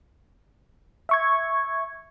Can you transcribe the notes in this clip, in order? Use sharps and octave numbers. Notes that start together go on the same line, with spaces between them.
E5 C#6 G#6